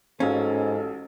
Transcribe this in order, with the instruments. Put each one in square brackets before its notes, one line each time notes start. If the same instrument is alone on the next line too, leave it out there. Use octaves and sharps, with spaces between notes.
[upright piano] A1 F#3 F5 [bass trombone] G#2 [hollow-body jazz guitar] C#4 [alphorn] A4